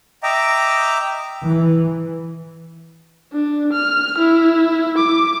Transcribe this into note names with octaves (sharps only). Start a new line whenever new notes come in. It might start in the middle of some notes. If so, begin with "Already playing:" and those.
D#5 E5 G5 A#5 D6
E3
D4
F6
E4
D6